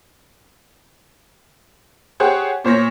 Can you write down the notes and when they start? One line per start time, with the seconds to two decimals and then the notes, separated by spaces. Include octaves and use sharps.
2.20 G4 G#4 C5 C#5 F#5
2.64 A#2 C5 C#5 A#6